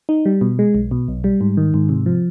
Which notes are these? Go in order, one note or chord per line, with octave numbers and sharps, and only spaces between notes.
D#4
G3
B2
G#3
B1
B2
B1
G3
G#2
D#3
G#2
C3
F3